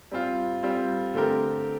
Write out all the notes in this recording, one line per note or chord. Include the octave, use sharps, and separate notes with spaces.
G3 C4 F4
G3 C4 F4
D3 A3 C4 G4 A#4